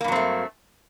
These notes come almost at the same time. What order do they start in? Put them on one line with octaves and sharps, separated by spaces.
A#3 G2 F#3 C4 A3